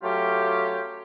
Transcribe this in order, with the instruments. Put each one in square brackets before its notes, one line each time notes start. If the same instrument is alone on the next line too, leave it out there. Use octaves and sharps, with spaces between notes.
[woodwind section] F#3 A3 C#4 F4 G4